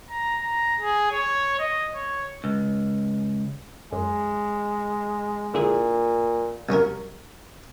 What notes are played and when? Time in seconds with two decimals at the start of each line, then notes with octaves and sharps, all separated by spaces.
0.10 A#5
0.42 A#5
0.80 G#4
1.12 C#5
1.59 D#5
1.95 C#5
2.44 C#2
3.92 F#2 G#3
5.54 A#2 D3 E4 G#4
6.69 C2 F#2 C#4 A#4